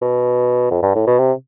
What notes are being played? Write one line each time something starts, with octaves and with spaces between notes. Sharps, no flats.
B2
F2
G2
A2
B2
C3